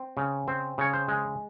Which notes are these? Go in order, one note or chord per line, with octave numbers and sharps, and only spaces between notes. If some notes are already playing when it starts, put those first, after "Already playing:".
Already playing: C4
C#3
C4 C5
C#3 C#5
C5
G#3